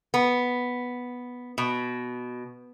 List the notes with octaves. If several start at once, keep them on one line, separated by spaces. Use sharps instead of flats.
B3
B2